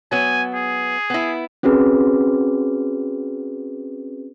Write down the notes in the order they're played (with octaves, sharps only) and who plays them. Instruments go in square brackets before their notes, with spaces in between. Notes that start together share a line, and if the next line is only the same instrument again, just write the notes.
[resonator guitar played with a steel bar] F#3 B3 [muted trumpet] G#5
[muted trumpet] G#4
[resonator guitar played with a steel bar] B3 E4
[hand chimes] C4 C#4 F#4 G#4 B4